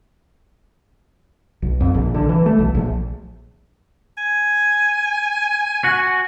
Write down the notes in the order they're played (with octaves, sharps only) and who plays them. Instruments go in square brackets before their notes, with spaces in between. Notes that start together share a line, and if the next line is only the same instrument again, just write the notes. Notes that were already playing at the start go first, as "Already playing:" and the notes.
[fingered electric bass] B1
F2
A#1
D3
E3
A3
B1
A#1
[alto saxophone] G#5
[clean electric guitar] F#4